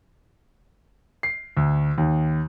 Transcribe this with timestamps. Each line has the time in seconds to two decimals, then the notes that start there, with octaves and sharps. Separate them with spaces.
1.23 C7
1.57 D2
1.98 D#2